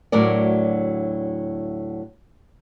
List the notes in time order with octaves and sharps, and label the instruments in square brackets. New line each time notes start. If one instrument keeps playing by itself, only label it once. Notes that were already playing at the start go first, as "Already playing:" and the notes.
[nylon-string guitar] D2 A2 F#3 A#4 D5